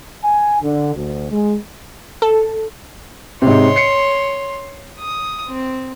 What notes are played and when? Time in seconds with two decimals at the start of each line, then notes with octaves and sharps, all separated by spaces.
0.24 G#5
0.63 D3
0.95 D2
1.31 G#3
2.22 A4
3.42 G#2 C3 C#5 C6
3.76 C7 C#7
4.99 D#6
5.48 C4